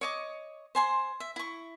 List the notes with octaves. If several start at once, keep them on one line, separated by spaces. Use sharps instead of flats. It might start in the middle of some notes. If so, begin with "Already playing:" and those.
C#5 D#5 D6
C5 G#5 C6
E5
E4 C#6